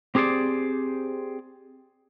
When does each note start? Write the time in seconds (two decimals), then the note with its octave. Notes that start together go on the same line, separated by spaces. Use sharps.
0.15 C4 G4 G#4 C5 D5